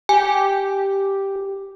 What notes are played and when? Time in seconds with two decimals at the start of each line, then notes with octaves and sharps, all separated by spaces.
0.09 G4 G#5